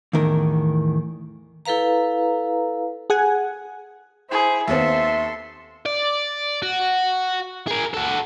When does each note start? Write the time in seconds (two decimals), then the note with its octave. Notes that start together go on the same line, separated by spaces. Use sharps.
0.13 E2 A2 D#3 A#4
1.65 E4 A4 B4 F5 A#5
3.10 G#4 F#5 G#5
4.30 E4 G#4 C5
4.68 D#2 B3 C4 A4 E5 C6
5.86 D5
6.62 F#4
7.67 G#4 A#4
7.94 F#4 A4